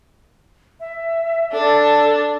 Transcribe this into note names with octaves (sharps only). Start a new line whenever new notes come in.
E5
D4 A4